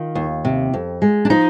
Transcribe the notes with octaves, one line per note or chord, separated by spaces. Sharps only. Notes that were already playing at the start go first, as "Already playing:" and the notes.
Already playing: D#3 F4
D#2
C3
F2
G#3
D4
F3 D#4